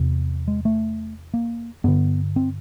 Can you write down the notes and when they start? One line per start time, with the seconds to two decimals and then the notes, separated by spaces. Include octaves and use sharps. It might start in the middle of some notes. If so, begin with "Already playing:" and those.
Already playing: E2 C3
0.48 G#3
0.65 A3
1.34 A#3
1.84 G2 D3 B3
2.36 C4